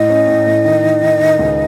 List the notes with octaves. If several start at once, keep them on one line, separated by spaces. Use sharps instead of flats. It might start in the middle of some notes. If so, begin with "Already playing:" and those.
Already playing: A2 D#5
C#4
A2
A2
D#3
D#3
D#3
D#3
C#2